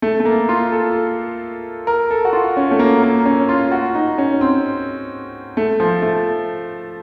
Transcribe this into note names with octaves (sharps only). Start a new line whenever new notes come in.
A3
A3
A#3
F4
A4
A#4
A4
F#4
F4
C#4
A3
A#3
A#3
C#4
F4
F#4
D#4
C#4
C4
A3
F3
A3